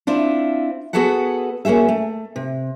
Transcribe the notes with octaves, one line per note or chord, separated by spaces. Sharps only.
C4 D4 E4 F4
B3 F#4 G#4 A4 B4 F#5
A#3 C#4 F#4 G#4 E5
A3
C3